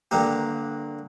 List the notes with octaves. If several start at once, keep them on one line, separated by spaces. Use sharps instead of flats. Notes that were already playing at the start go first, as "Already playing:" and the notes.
G2 D3 A#3 G4